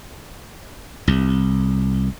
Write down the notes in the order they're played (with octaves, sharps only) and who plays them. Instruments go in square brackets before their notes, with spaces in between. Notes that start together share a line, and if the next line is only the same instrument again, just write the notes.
[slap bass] C2